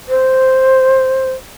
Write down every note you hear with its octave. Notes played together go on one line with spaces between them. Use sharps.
C5